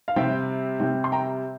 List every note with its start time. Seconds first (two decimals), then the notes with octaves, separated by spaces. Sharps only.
0.08 F5
0.16 C3 G3 C4 E5 G5
0.80 C3 G3 C4
1.04 C6
1.12 G5 A#5